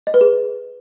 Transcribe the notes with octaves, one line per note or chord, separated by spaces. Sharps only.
D#5
B4
G#4